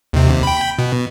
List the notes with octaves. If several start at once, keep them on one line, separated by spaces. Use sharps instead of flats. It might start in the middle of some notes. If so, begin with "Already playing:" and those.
D#2 C3
G5 B5
B2